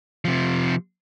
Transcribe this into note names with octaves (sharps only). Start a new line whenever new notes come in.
C3 F3